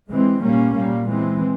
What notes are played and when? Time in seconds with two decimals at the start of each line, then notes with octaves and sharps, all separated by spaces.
0.11 E3 G#3 C4
0.43 A#2 G3 A#3 C#4
0.77 A#2 G3 A#3
1.10 E3 G#3 C4